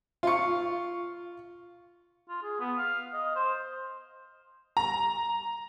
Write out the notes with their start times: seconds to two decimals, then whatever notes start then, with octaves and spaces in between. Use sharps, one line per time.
0.23 F4 C#6
2.29 F4
2.43 G#4
2.60 B3
2.78 F5
3.13 D#5
3.36 C5
4.77 A#5